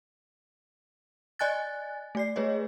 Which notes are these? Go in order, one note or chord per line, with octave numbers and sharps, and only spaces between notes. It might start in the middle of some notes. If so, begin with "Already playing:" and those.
D5 D#5 G#5 F#6 A6
A3 D5 C7
A3 G#4 B4 C#5 D#5